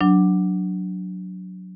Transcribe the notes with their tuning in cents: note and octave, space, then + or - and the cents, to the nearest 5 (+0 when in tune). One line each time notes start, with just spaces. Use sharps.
F#3 -5 D4 +0